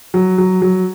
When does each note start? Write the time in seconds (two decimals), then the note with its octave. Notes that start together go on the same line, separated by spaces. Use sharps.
0.14 F#3
0.38 F#3
0.62 F#3